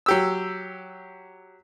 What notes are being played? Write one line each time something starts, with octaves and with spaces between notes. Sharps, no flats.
F#3 G4 E6